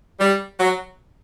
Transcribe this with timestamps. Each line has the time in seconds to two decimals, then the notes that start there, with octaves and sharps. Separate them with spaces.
0.19 G3
0.59 F#3